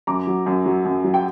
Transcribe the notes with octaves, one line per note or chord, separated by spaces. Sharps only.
F#2 A#5 D6
F#3
F#2
F#3
F#2
F#3
G5